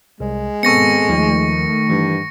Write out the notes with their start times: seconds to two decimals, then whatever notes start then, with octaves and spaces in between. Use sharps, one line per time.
0.20 C2 G#3
0.63 G#1 B2 B3 C4 A4 C#6 A#6 C#7
1.09 D#2 D#3 F3 A3 D#4
1.90 G2 E3